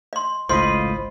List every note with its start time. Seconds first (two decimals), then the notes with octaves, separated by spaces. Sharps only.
0.13 D#5 C6
0.49 G#1 C#2 A2 F4 C5 D#5 B5 C6